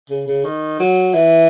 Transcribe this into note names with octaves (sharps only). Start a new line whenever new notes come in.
C#3
C#3
D#3
F#3
E3